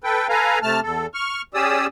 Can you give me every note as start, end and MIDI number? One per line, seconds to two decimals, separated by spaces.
0.04 0.27 69
0.04 0.27 71
0.04 0.27 79
0.29 0.59 69
0.29 0.59 71
0.29 0.59 77
0.29 0.59 80
0.29 0.59 82
0.62 0.80 48
0.62 0.80 57
0.62 0.80 81
0.62 0.80 89
0.83 1.06 40
0.83 1.06 69
1.14 1.42 85
1.14 1.42 89
1.54 1.86 61
1.54 1.86 67
1.54 1.86 68
1.54 1.86 74
1.54 1.86 87
1.54 1.86 88